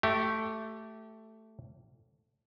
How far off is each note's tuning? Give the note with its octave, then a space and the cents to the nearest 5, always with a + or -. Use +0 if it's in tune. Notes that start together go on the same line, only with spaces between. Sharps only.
A3 +0 G4 -20